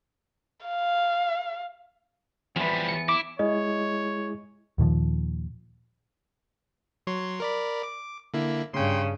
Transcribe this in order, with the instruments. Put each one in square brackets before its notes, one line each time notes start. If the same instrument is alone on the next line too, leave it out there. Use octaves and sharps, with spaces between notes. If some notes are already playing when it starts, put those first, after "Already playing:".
[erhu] F5
[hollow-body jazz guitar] E2 B4 [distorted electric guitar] F3 G3
[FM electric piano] C#7
[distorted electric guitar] E4 [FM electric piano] D6
[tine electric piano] G#3 E4 G#4 [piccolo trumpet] C#5 [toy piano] D#5
[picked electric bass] D#2 A#2 D#3 F3
[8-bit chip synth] F#3 C#5 C6
A#4 D5 B5
D6
D3 A#3 E4
[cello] G2 C#3 [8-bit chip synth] G5 C6